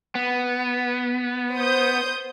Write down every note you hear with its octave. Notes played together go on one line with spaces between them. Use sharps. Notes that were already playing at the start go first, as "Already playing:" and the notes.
B3
C5 D#6 G6